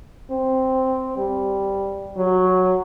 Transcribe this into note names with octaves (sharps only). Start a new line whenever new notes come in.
C4
G3
F#3